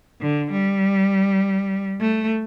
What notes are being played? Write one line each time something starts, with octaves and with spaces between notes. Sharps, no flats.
D3
G3
A3